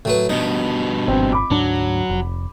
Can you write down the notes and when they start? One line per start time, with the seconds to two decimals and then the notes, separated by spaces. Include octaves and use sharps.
0.05 A2 F#3 B4
0.29 G2 B2 D#4
1.08 G#1 C4
1.33 B5 D6
1.51 D2 G#2 F#3 D4
2.09 F1